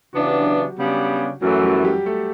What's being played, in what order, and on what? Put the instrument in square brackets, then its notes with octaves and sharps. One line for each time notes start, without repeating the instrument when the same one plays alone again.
[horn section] C#3 E3 B3 D4 [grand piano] F#4
[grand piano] G4
F#3 F#4
[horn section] C#3 G3 B3 D4
[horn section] F#2 E3 A3 [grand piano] F#3 F#4
[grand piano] G3 G4
G3 G4
A3 A4